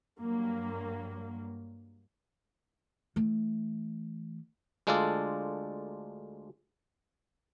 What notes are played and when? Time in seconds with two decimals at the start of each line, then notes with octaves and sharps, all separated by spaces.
0.19 G2 F#3 A#3
3.16 E3 A3
4.87 D2 G#3 D4 F4 A4 D5